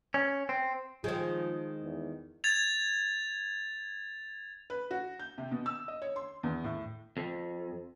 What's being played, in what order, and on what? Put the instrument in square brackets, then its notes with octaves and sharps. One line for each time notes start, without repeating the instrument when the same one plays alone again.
[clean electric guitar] C#4
C4
[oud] D#3 G#3 [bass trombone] F3 [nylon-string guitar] G#4 C5
[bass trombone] E2
[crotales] G#6 A6 F7
[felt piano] B4
F#4
G6
C3
B2
E6
D#5
C#5
C6
E2
A2
[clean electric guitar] F2